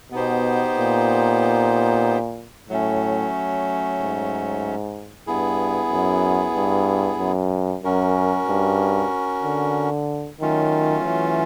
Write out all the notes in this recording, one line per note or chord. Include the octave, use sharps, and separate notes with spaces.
B2 B3 D#4 G4 C5
A#2
A2 F#3 A3 C#4
G#2
G2 B3 E4 G#4
F#2
G2
F#2
F#2 C#4 F#4 A#4
G2
D3
D#3 F#3 A3 C#4 F4
E3